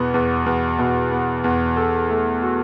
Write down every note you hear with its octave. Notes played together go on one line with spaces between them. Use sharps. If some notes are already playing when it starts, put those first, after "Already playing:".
Already playing: E2 B2 B3
E2
E2
B2
B3
E2
A4
A3
F#4